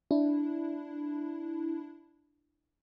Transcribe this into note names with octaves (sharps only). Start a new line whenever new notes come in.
D4 E4